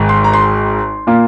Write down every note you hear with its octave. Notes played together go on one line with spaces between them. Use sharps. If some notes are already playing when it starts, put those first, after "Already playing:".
Already playing: G#1 G#2 D#3 G#3
C6
A#5
C6
A#2 A#3 F4